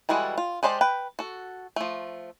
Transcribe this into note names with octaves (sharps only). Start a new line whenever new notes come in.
E3 G3 G#3 F#4 A4
F4
G#3 G4 C5 D5 A5
B4 G5
F#4 A4
F3 A3